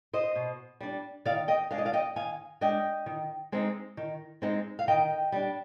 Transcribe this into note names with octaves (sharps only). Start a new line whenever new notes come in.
C5 D#5
B2
G3 D4
D#3 D5 F5
D#5 G5
G#3 D4 F5
D#5
D5 F5
D#5 G5
D#3 F5 G#5
G#3 D4 D#5 G5
D#3
G#3 C4 D#4
D#3
G#3 C4 D#4
F5
D#3 D#5 G5
G3 D4